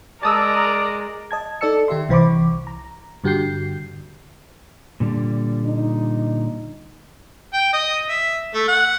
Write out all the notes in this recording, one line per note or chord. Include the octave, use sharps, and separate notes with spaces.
G#3 A#4 D5 A5 D#6 E6
D#5 A5 G#6
D#4 A4 D5 A5 E6 C#7
D#3 G4 E5 C6
C2 E3 C5 B5 C#6 D6
A#5
G2 D3 F#4 G4 G6 C7
A#2 D3 G3
D#4
G5
D#5
E5
A3
F#5